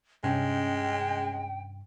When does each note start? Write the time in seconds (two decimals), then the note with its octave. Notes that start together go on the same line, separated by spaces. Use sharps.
0.24 G2 C3 G#3 C#4 G5